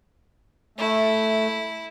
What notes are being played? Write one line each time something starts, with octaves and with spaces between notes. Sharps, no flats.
A3 E4